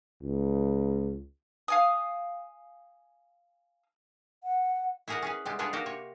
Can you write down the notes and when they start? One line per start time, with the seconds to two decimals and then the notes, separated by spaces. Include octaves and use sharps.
0.22 C#2
1.68 F5 G#5 D#6
4.44 F#5
5.08 E4 F#4 G#4 A#4 D5 F#5
5.22 C#4 G#4 B4
5.45 C3 G3 G#3 B3
5.59 B3 D4 F4 G#4 B4 C#5
5.73 A#3 F#4 G4
5.86 C3 C#5